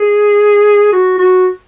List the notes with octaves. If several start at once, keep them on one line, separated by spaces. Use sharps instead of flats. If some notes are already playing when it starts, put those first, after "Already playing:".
Already playing: G#4
F#4
F#4